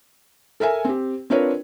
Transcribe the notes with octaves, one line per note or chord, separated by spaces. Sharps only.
A4 A#4 E5 G#5
C4 G4
C4 D4 F4 A#4 B4 C#5